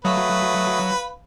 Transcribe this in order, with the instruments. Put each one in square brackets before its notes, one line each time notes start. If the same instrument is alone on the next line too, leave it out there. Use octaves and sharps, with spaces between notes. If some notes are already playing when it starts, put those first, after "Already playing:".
[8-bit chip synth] F#3 [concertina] A3 D#6 [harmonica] B4 [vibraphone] F5 B5